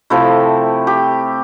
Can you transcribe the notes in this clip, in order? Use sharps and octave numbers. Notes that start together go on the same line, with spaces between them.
C3 F3 A3 E4
G4